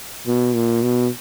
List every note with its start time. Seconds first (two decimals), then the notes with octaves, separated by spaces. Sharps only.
0.27 B2
0.55 A#2
0.83 B2